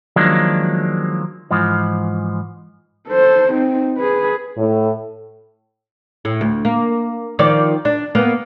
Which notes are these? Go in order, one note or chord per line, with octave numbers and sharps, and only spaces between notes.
D#3 F3 F#3 G#3 A#3 D4
G#2 E3 F3
A4 C5
C4 D#4
G#4 B4
A2
A2
D2
A#3
D#3 F3 D5
D4
A#3 B3